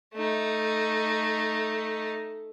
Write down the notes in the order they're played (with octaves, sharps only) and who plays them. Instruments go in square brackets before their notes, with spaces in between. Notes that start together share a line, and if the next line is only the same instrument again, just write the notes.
[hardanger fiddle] A3 D#4